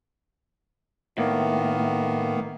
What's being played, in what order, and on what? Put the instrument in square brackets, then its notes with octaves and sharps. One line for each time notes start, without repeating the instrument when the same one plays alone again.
[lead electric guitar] A2 [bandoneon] D#3 A#3 B3